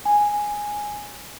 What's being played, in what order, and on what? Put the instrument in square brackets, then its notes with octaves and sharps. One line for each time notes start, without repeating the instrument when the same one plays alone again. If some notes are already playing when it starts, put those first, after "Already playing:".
[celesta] G#5